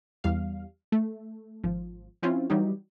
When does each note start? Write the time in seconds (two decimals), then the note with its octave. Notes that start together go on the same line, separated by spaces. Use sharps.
0.24 E2 G3 F5
0.92 A3
1.63 G#1 F3
2.23 F3 C4 C#4 E4 F4
2.50 E3 F#3 G3 D#4 G4